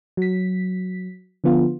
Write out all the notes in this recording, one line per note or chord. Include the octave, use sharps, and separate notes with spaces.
F#3 B6
D3 F3 B3 F4